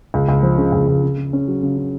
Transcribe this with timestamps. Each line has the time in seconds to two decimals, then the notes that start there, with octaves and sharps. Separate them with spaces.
0.14 C#2
0.29 C#2
0.43 F3
0.58 C#3
0.72 C#2
0.87 C#2
1.03 C#3
1.17 C#3
1.33 C#4
1.48 F#3
1.63 C#3
1.78 C#3